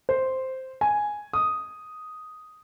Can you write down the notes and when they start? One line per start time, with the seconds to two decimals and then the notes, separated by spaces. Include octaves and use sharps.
0.09 C5
0.81 G#5
1.33 D#6